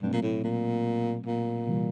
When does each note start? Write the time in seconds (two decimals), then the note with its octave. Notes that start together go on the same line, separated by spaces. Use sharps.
0.02 G2 B2 F#3 A3 C4
0.13 A#2
0.23 A2
0.44 A#2
1.26 A#2
1.67 C3 E3 G3